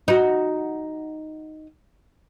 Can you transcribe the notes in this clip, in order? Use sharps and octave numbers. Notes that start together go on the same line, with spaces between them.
D#4 F#4